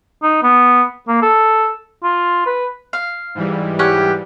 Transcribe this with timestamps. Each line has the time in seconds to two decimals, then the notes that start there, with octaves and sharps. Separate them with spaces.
0.23 D#4
0.43 B3
1.08 A#3
1.22 A4
2.04 F4
2.46 B4
2.93 F5
3.35 G#2 E3 G3
3.79 C#4 G4 F#5